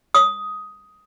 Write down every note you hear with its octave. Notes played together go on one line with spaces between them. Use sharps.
D#6